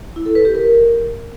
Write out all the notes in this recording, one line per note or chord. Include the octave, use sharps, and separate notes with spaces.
E4
A4
B4
G4
A#4